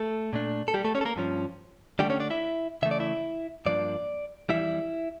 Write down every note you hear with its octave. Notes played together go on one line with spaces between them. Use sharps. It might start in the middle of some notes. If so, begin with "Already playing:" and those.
Already playing: A3 A4
A#2 A3 D4
A4
G3 G4
A3 A4
C#4 C#5
A4
A#3 A#4
G2 F3 C#4
D3 G3 A3 D4 G4
C#4 C#5
D4 D5
E4 E5
C#3 E3 A3 E5
D5
E4 E5
G2 F3 A#3 D4 D5
F2 C#3 E3 G3 E4 E5